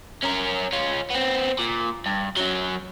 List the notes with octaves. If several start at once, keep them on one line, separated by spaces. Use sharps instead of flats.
C#4 A#4
C#4 F4
B3 C4
A#2
G2
F#2 F#3